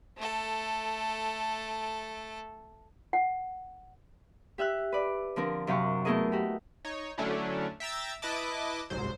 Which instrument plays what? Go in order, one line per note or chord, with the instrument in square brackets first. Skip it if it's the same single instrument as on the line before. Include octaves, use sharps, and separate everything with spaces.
[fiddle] A3 A4
[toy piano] F#5
[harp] G4 E5 E6 F#6
B4 D5
D3 F3 C4 A#4
F#2 C3 F5 G5 C#6
A3 B3 E4 G#4 A#4 D#5
F#4 G4
[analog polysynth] D#4 C#5
D3 F#3 A3 C#4 D4 E4
E5 G5 A#5 E6 A6
E4 B4 D#5 A5 D6
G1 C2 G#2 F#3 C5